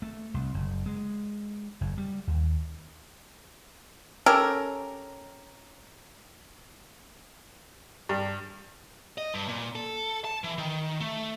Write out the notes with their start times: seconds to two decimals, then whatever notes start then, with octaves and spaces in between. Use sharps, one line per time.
0.02 A3
0.34 C2
0.54 F#1
0.86 G#3
1.81 F#1
1.98 G3
2.27 D#2
4.26 C#4 G4 A4 A#4
8.09 G2
9.18 D#5
9.34 G2
9.48 A#2
9.75 A4
10.24 A5
10.44 E3
10.58 D#3
11.00 A3